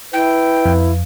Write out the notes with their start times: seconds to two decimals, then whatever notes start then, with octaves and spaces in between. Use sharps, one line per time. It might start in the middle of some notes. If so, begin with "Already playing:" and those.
0.13 E4 B4 G5
0.65 F2